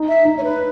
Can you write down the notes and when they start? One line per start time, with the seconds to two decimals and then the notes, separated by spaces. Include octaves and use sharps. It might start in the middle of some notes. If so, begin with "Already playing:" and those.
Already playing: D#4
0.08 E5
0.25 D#4
0.38 C#5
0.43 B4